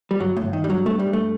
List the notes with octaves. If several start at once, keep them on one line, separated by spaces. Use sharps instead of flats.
G3
G1 F#3
A2
G1
D#3
G2 G3
F#3
G2 A3
G3
G2
A3